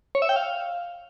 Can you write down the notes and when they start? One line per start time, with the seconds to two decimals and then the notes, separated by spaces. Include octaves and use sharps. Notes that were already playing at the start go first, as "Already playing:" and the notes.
0.15 C#5
0.22 E5
0.29 G5
0.36 F5